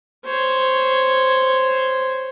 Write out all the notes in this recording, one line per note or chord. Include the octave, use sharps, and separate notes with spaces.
C5 C#5